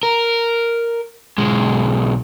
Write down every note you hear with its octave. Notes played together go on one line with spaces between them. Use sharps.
A#4
B1 G#3